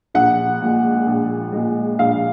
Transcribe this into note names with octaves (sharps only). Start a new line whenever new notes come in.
A#1 F#5
A#2 G#3
A#1
A#2 G#3
A#1 F5